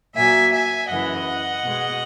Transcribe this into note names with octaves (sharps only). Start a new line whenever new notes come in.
A#2 F#3 E5 G#5
E5 G#5
F#2 C#3 E3 D#5 F#5
B2 G#3